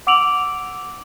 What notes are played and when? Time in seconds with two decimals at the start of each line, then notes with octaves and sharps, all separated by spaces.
0.07 F#5 D6 E6 D7 F7 F#7